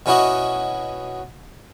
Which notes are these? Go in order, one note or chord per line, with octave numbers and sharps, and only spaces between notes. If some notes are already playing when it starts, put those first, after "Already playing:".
B2 C#4 E4 F#4 D#5